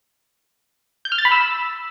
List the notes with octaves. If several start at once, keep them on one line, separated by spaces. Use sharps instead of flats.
G6
F6
A6
B5
E6